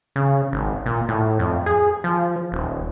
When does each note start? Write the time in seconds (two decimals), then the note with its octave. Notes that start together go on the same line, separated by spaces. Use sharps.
0.16 C#3
0.53 G#1
0.86 A#2
1.08 A2
1.39 F2
1.66 G#4
2.04 F3
2.52 D#1